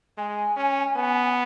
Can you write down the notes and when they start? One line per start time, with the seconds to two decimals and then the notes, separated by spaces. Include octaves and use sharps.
0.17 G#3 G#5
0.57 C#4
0.96 B3